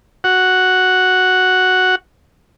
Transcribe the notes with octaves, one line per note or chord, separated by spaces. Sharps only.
F#4 F#5